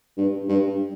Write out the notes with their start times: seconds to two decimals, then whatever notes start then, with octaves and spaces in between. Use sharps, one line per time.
0.17 G2
0.49 G2